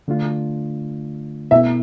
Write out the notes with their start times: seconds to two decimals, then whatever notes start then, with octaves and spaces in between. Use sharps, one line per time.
0.08 D3 A3 D4 F4
1.51 B2 B3 E4 E5